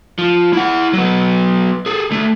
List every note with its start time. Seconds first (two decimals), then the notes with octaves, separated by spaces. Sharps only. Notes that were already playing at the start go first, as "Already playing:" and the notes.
0.19 F3
0.53 E4 F#5
0.93 F#3 B3
1.86 G#4 A4
2.11 D2 A3